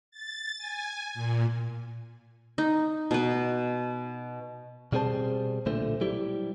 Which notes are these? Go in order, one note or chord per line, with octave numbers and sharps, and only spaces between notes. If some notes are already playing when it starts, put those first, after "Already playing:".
A6
G#5
A#2
D#4
B2 B4
B2 G3 C4 G#4 C5 A5
B1 A#2 D3 A3 C5
F#3 G3 E4 G4